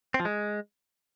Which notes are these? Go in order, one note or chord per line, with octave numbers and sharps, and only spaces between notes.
C4
F3
G#3